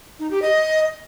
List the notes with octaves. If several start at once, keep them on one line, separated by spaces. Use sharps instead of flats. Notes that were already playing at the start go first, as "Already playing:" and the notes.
D#4
G4
D#5